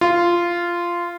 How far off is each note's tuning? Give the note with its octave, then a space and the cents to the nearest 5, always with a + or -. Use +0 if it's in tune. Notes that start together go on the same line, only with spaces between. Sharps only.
F4 -10